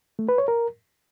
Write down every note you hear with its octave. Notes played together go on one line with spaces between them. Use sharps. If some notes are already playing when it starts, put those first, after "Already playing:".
A3
B4
C#5
A#4